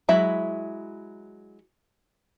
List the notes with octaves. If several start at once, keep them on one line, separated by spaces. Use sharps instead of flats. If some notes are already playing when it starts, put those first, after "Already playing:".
F#3 G#3 E4 E5 B5